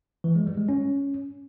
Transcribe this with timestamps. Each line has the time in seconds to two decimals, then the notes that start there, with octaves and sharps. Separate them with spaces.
0.24 E3
0.35 G#3
0.46 G3
0.57 G#3
0.69 C#4